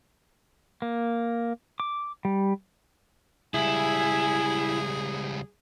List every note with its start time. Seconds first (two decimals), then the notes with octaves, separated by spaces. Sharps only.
0.82 A#3
1.80 D6
2.25 G3
3.54 C#2 G3 E4 G#4 G#5